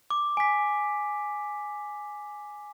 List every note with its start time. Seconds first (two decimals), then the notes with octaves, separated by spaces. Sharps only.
0.11 D6
0.37 G#5 B6